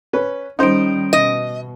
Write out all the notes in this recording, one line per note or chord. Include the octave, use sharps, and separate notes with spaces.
C#4 B4
D#3 G3 C#4 D#4 C5 D7
B2 D#5